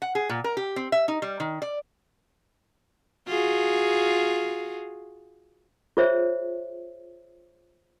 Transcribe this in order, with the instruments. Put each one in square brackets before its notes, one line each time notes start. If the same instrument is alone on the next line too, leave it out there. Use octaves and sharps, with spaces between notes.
[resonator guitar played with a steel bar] F#5
G#4
A#2
A#4
G4
C4
E5
D#4
G3
D#3
D5
[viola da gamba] F4 F#4 G#4
[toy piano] F4 G#4 C5 C#5 E5